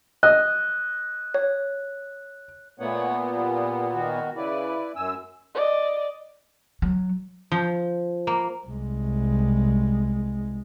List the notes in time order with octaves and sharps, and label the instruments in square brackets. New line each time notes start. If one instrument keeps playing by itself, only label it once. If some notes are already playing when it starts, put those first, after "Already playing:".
[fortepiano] D#5 [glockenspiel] F#6
[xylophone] C#5
[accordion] A#2 B3 [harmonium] A3 C#5 F#5
[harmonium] G3
D#3 F#4
[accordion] C#3 [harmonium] E4 B4 D5
[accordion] F#2 E6 [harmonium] G#5
[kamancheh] D5 D#5
[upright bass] F#3
[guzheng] F3
A#3
[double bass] C2 G#3